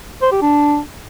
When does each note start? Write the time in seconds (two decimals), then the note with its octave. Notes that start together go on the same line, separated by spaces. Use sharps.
0.22 C5
0.32 G4
0.42 D4